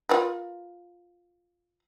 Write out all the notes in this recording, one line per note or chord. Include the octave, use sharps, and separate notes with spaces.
F4 A#4 B4